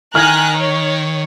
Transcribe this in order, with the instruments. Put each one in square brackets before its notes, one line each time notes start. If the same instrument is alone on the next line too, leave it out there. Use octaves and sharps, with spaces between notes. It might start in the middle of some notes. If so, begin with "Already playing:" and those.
[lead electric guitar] D#3 [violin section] G#5 A#5 F#6 [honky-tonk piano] F6 G#6
[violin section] C#5